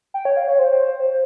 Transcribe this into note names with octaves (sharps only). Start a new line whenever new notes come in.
G5
C#5
F5
C#5
C5